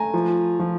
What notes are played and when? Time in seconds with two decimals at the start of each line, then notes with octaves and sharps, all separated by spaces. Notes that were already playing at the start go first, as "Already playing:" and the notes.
Already playing: A3 G#5 A#5
0.14 F3
0.60 F3